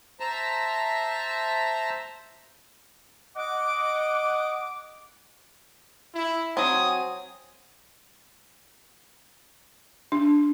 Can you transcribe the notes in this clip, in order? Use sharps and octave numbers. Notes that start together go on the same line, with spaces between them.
C5 E5 A5 A#5 E6
D#5 F#5 D6
E4
F#3 C4 G#5 D#6
D4